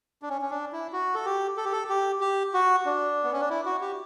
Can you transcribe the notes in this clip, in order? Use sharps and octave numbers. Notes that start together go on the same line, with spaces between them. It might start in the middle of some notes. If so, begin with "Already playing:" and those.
D4
C#4
C#4
D4
E4
F#4
A4
G4
A4
G4
A4
G4
G4
F#4
D4
B3
C#4
D4
E4
F#4
G4